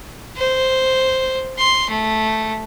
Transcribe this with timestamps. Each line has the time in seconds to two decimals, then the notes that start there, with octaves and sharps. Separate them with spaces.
0.37 C5
1.58 C6
1.89 A3